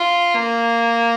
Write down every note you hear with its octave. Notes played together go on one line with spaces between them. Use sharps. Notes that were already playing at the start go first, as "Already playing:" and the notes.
Already playing: F4
A#3